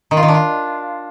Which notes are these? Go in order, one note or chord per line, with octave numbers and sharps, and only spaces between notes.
D#3
F4
D#3
D4
F4